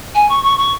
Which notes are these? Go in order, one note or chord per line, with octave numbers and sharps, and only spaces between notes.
G#5
C#6
C#6
C#6